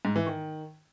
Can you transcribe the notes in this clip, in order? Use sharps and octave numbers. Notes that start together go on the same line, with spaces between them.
G#2
E3
D#3